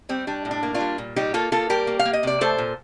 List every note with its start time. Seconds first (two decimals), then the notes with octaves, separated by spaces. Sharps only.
0.09 G3 C4
0.27 G3 D4
0.45 A2
0.51 D4
0.63 A#3
0.74 D4 F4
0.80 G3
0.98 A#2
1.16 G3 D#4 G4
1.34 A#3 F4 A4
1.52 A#3 F4 A4
1.70 G3 G4 A#4
1.87 A#3
1.99 F5
2.05 A#3
2.13 D#5
2.23 C3 D5
2.41 A3 A4 C5
2.58 A#2